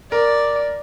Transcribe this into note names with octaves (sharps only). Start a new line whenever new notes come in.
A#4 D5